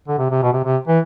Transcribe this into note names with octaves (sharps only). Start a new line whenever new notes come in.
D3
C3
C3
B2
C3
C3
E3